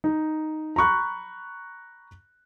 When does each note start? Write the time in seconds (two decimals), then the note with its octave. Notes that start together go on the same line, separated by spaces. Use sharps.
0.04 D#4
0.76 A#5 B5 C#6 F#6